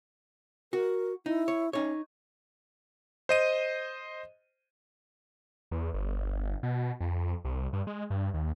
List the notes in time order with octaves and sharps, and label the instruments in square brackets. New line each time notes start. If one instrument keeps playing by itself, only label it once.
[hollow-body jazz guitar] F#4 [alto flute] A#4
[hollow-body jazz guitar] D#4 [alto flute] E4
[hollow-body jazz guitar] C#5
[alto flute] C#4 [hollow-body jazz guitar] D#4 C#5
[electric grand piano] C5 D#5 D#7
[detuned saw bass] E2
G1
B2
F2
C2
G2
G#3
G2
D#2